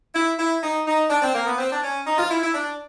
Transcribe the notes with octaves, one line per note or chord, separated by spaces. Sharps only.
E4
E4
D#4
D#4
D4
C4
A#3
B3
C4
D4
C#4
D#4
F4
E4
E4
D4